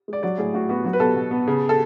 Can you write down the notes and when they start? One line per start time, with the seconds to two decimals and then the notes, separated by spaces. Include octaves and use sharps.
0.08 G#3 D5
0.23 F#3 D5
0.38 A2 G#4
0.54 A2 F#4
0.69 B3 F#4
0.85 F#3 F#4
0.93 B4
1.00 B2 A4
1.16 B2
1.31 B3
1.48 C#3
1.69 A4